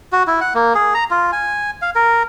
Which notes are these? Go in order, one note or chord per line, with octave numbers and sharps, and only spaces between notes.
F#4
E4
F#5
A#3
G#4
A#5
F4
G#5
F5
A#4